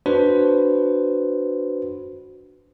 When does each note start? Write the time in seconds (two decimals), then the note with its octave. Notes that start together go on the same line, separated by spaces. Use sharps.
0.06 D4 F#4 B4 C5